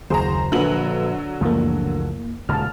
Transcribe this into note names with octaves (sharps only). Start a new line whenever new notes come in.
F#1 D#2 F#3 G#4 C5 A#5
A#1 D3 F#3 A4 B4 F#7
C#2 F#2 E3 F3 A3 A#3
D#1 C#2 G#2 A5 F6